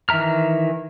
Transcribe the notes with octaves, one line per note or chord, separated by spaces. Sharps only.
D#3 E3 E5 A#5 F6